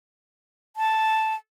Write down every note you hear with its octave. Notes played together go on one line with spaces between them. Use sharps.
A5